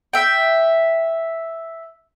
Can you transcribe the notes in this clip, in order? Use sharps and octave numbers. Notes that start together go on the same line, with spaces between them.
E5 G5